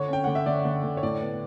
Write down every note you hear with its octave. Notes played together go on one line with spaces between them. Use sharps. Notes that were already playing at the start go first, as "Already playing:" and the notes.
Already playing: D3 C#5
C#4 G5
D3 F#5
E5
D3 D5
D3
D3
C#5
A2 D5
B3